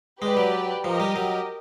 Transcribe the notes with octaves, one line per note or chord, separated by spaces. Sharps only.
G#3 G4 B4 D5
F#3
F3 G4 A#4 D#5
G3
F#3